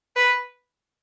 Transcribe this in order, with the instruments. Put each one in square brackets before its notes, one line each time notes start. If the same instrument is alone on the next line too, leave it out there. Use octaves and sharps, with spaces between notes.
[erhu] B4